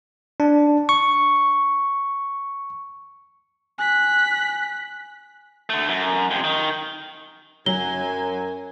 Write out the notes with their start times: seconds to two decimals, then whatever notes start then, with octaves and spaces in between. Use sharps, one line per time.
0.40 D4
0.89 C#6
3.78 G#5 F#6 B6
5.70 D3 A3
5.89 F#2
6.31 F2 C3
6.44 D#3
7.66 F#2 F#3 G#5 G7